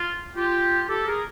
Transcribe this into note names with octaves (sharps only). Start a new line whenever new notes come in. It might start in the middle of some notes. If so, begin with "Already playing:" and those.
Already playing: F4
F4 G4
G4 A4
G#4 A#4